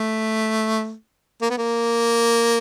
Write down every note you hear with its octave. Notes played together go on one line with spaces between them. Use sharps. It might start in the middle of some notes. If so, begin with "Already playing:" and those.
Already playing: A3
A#3
B3
A#3